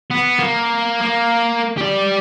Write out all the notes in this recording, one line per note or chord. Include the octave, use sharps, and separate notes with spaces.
B3
A#3
A#3
G4 D5